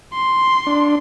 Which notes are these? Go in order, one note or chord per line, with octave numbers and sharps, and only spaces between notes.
C6
D4